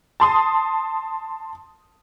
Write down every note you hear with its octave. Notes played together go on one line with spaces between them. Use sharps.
A5 C6 D#6